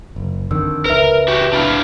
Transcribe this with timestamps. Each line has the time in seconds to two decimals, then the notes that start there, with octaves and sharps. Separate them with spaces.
0.16 F#1
0.51 F2 D3 D#3 E6
0.85 C#2 A#4 B4 E5
1.28 F#4 G4
1.53 D4 E4 F5